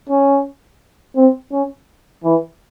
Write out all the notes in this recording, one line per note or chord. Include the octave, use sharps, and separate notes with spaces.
C#4
C4
C#4
E3